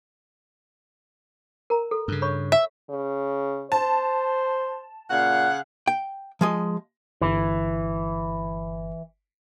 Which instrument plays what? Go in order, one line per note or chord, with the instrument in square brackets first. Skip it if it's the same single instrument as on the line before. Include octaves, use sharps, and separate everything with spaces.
[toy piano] A#4 A#5
A4
[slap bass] G2 C#3
[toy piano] C#5 B5 C#6
[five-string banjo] E5
[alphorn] C#3
[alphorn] C5 [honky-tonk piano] A5
[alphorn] A#2 [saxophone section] C#3 F5 F#5
[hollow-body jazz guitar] G5
F3 G#3 D#5
[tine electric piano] G1 [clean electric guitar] E3